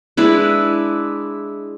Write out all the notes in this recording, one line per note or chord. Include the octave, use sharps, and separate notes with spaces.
G#3 D4 E4 B4